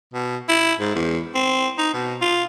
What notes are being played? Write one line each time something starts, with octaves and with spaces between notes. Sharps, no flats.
B2
E4
G#2
E2
C4
D#4
B2
F4